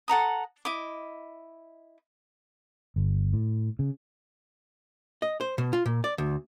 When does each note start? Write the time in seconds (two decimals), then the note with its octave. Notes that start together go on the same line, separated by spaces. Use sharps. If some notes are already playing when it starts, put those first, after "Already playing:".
0.08 A4 F#5 A#5 D#6
0.65 E4 D#5 D6
2.96 G1
3.33 A2
3.79 C#3
5.22 D#5
5.41 C5
5.58 B2
5.73 F4
5.86 A#2
6.04 D5
6.18 D2